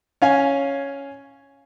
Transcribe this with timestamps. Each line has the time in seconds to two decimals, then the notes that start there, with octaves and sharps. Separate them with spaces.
0.22 C#4 F5 G#5